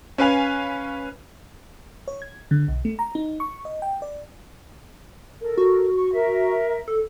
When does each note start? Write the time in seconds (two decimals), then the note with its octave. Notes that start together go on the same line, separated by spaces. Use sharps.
0.18 C#4 B4 F5 G#5 F7
2.08 C#5
2.22 G#6
2.51 D3
2.68 B1
2.85 A3
2.99 A#5
3.15 D#4
3.40 C#6
3.65 D#5
3.82 G5
4.02 D5
5.41 A4 A#4
5.58 F#4
5.96 C#6
6.13 A#4 E5
6.88 A4